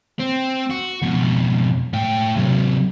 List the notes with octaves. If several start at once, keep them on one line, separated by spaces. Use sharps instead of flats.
C4
F#4
F2 B2
A2 G5
C3 F#3